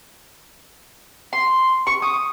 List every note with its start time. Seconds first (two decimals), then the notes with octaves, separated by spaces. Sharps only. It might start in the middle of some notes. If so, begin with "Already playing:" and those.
1.33 C6
1.87 C#6
2.02 D#6